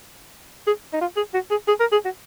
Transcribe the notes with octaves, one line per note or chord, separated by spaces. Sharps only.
G#4
D#4
F4
G#4
F#4
G#4
G#4
A#4
G#4
F#4